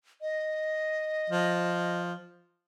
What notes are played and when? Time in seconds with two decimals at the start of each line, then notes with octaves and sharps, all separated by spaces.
0.22 D#5
1.30 F3